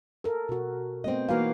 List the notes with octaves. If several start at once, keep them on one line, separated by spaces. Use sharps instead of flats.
A4 A#4
B2 F#4
A3 B3 C4 C5 D#5
E3 A#3 D#4 F#4 F5